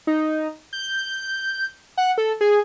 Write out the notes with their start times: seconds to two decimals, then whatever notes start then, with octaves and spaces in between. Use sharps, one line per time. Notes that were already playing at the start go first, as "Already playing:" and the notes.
0.07 D#4
0.73 G6
1.98 F#5
2.18 A4
2.41 G#4